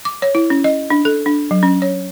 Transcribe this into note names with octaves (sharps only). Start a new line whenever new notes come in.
D6
C#5
E4
C#4
D#5
D4
A4
D4
F#3
C#4
C#5